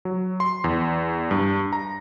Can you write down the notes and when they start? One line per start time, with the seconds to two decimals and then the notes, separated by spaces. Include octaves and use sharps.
0.05 F#3
0.40 C6
0.64 E2
1.31 G2
1.73 A#5